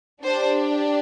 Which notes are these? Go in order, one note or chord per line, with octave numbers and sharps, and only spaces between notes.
D4 G4 C5